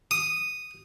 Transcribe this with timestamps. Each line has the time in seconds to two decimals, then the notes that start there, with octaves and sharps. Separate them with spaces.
0.11 D#6